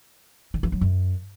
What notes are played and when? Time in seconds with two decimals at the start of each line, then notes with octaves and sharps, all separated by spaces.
0.54 D3
0.63 E3
0.72 F#3
0.81 F#2